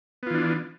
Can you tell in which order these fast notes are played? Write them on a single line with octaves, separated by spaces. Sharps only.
B3 F4 E3 D4